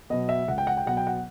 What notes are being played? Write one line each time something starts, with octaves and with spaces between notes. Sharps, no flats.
B2 F#3 B3 D#5
E5
C#2 F#5
G5
F#5
G5
B2 F#3 B3 F#5
G5
F#5